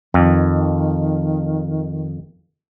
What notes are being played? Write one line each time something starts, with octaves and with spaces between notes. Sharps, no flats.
F2 D#3